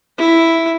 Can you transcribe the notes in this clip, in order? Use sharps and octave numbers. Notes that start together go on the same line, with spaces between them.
E4